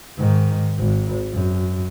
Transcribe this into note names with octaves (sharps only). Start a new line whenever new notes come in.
G#2 D#3
G#1
F#2